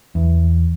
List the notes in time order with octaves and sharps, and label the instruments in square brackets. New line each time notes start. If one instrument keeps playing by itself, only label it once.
[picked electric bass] E2